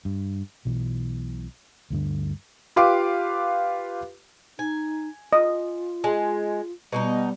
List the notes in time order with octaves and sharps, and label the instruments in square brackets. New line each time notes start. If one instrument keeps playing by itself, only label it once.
[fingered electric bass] G2
B1 B2 E3
D2 G2 D3
[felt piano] F4 G4 B4 F5 C6 D6
[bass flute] D#4 [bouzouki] G#5
[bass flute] F4 [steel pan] D#5
[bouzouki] G#3
[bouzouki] B2 B3 D#4 [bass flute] G3